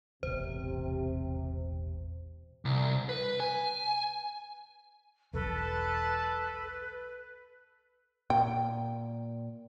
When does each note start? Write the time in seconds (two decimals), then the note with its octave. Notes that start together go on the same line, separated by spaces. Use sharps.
0.23 E1 A1 E2 C3 C5
2.65 C2
3.09 B4
3.40 G#5
5.34 E1 B1 E2 A4 B4 A5
8.30 A#2 G5